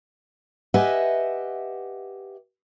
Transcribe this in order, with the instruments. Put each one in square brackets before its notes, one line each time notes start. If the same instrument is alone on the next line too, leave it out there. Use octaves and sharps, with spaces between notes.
[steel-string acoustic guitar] G4 B4 D#5 E5 F#5 G#5